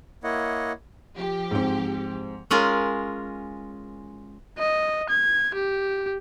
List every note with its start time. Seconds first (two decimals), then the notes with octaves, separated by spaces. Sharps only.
0.24 A#3 E4 C#5 D#5 F#5
1.16 F3 G4
1.51 G#2 C4
2.51 G#3 C#4 F4 A#4
4.58 D#5
5.09 G#6
5.55 G4